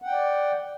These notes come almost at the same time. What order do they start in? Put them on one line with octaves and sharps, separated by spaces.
F#5 G5 D5